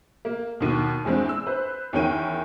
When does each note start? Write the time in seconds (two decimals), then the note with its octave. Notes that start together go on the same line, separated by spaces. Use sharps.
0.25 A#3
0.60 D#2 B2
1.05 E2 G#3 C4 D4
1.29 E6
1.47 B4 C5
1.93 E2 D#3 C#4 A#4 G5 D#7